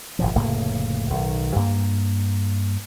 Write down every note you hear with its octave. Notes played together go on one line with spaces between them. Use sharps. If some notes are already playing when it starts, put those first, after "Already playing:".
G#1 A#2 F3
F1 A2 C#3 A#3
B1 D#3
G2 A#3